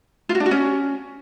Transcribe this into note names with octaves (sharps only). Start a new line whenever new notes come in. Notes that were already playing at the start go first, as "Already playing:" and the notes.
F4
F#4
D4
F#4
C#4